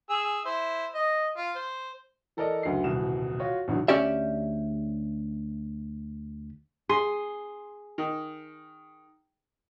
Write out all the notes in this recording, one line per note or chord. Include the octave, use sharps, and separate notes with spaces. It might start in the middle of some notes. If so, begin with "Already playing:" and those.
G#4 E6
E4 C5
D#5
F4
C5
E3 A4 A#4 D5 D#5
F#1 D2 C7
D#1 C2 B2 E3 E7
F4 F#4 C#5
A1 G#2 B2 D3 E3 F#3
D2 C#4 G4 D5 E5
G#4 C6
D#3